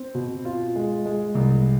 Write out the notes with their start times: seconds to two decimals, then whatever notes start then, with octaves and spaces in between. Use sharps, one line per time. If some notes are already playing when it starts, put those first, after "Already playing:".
Already playing: C4
0.15 B2
0.45 F4
0.76 G#3
1.06 G#3
1.35 C2